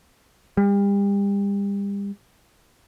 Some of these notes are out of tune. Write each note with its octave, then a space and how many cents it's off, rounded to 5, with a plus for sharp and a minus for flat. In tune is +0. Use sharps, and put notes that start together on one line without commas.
G3 +35